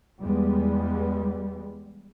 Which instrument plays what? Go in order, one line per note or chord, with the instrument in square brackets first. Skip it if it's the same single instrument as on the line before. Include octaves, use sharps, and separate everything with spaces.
[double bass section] E2 G3 G#3 B3